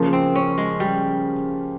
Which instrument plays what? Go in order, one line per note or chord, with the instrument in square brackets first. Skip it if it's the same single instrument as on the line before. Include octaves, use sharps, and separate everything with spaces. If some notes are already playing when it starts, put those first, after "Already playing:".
Already playing: [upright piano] C#3 F3 A#3
[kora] C4
C#4
G#3
G3